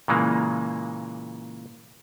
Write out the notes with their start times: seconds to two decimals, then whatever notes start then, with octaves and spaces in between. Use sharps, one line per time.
0.08 A#2 C#3 E3 G#3 A#3